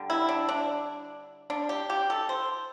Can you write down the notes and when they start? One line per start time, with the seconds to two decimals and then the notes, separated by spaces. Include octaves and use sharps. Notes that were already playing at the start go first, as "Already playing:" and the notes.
Already playing: D3 G3
0.10 E4
0.29 D4
0.49 D4
1.50 D4
1.69 G4
1.90 G4
2.10 A4
2.29 C5